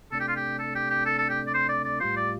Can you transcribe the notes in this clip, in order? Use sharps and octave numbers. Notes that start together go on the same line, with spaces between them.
C3 A3 D4 A4
G4
F4
G4
A4
G4
G4
A4
A4
G4
D5
C5
D5
D5
A2 G3 F4 C5
D5